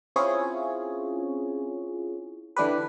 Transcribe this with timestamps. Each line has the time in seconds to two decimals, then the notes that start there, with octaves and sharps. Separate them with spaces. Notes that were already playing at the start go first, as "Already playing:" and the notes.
0.16 C4 C#4 E4 F4 G#4 C#5
2.56 D3 E3 D4 G4 B4